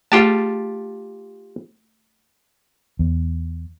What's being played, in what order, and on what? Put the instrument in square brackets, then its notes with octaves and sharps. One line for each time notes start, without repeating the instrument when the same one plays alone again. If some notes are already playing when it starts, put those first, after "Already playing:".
[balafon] A3 G#4 [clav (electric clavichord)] F4 G4 A5
[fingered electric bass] E2